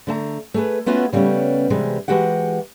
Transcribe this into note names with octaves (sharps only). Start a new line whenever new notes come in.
D3 A3 A5 A#5
A3 G#4 B4
A3 B3 C#4 F4 F#4
C#3 G3 A3 B3 C#4
C3 E3 G3 G#3
E3 G#3 F#4 G4 F#5